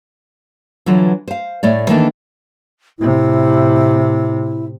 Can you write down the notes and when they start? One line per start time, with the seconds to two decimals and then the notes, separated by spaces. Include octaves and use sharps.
0.86 D3 E3 F#3 F4
1.28 C5 F5
1.63 A2 A3 C#5 D5
1.89 D#3 E3 A3 A#3 D4 D#4
2.99 A2 C3 E4